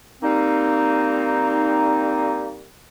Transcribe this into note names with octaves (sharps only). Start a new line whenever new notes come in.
G3 A#3 C4 D#4